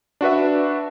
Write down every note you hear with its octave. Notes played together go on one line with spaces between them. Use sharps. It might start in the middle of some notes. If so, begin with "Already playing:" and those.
D4 F#4 B4 E5